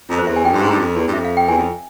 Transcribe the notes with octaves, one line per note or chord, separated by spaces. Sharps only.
F2 A#5
C5
F2
E2 E5
G#5
F2 G5
G2 C6
G#2 A#5
G2
F2
E2
G2
F2 E5
F5
G5
E2 G#5
F2